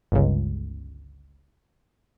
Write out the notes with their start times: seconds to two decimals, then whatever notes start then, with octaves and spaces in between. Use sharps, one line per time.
0.12 G1 C#2